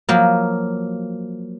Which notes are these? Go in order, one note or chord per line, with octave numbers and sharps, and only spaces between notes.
F3 F#3 A#3